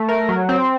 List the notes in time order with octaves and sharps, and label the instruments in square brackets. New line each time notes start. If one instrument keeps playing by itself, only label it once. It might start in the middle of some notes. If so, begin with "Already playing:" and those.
Already playing: [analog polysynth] A3
A#4
F#3
C4